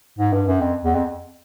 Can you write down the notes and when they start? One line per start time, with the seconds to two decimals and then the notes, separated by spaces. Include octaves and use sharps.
0.19 G#2
0.33 G2
0.47 F#2
0.61 F2
0.84 E2
0.94 F2